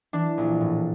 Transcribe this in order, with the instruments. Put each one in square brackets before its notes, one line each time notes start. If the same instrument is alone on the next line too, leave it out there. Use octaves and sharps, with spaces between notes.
[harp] E3 D4
A#1
A2